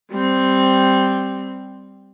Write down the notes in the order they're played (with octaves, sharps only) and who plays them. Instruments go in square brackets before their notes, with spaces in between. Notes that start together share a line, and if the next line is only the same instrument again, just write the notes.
[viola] G3 C4